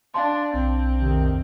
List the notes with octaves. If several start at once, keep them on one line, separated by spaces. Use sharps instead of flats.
D4 F5 A5 C6
B1 C4
F2 C3 D#3